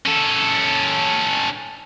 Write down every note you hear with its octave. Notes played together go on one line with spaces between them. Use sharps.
C#4 A4